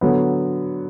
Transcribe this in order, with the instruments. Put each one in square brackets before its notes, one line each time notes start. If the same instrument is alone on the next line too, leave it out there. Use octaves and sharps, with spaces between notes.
[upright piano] D3 F#3 B3